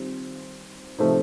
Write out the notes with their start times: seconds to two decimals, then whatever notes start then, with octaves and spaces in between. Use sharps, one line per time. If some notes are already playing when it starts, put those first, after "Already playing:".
Already playing: D#3 G3 C4 F4
0.99 C3 F3 A3 C4 D#4